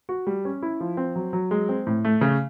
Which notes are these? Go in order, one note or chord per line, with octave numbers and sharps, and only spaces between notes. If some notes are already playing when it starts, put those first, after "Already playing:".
F#4
G3
C#4
E4
F3
C4
F#3
F#3
G#3
C4
A2
A3
C#3